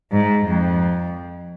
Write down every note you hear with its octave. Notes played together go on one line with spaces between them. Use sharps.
G#2
F2